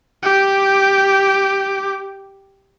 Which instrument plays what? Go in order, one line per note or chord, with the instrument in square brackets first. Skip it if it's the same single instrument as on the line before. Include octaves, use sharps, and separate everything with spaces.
[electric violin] G4 D6